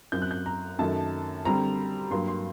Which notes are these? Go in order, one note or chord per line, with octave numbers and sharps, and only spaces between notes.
F#2 F#3 C4 G6
F#6
G6
A#5
F#2 D#3 A3 A5
D3 G3 C4 A#5
G2 F#3 A#3 C6
C6